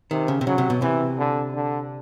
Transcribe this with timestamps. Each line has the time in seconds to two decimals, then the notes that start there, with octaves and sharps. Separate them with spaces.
0.11 C3 D#3
0.28 C#3
0.41 C3
0.46 C#3 F#3
0.58 C3
0.70 B2
0.82 C3 E3
1.18 D3
1.54 D3